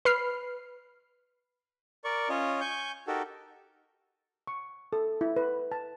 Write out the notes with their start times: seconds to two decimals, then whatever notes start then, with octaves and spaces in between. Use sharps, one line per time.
0.05 B4 B5 F6 C7
2.04 A#4 D5 C#6
2.29 C#4 F4 C#5 D#5
2.61 G#5 C#6 G6
3.07 D#4 F#4 G4 A4 A#4
4.47 C#6
4.93 A4
5.21 E4
5.36 B4
5.72 A5